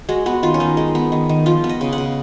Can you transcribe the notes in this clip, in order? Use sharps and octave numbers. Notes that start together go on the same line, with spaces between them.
G#3 F#4
B3 F#4
D#3 F4
C#4
D#3 D#4
G#3
B3
D#3
D#3
F3 F4
B3
D#5
C#3
F#5
C#3